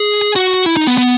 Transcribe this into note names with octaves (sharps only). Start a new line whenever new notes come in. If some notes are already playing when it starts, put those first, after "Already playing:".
Already playing: G#4
F#4
E4
D#4
B3
B3